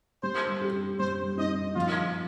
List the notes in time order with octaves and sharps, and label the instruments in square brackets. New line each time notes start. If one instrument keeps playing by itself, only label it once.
[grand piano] G3 [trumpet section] C5
[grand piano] G4
[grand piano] G3 [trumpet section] C5
[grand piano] D#4 [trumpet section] D#5
[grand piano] F3 [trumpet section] F4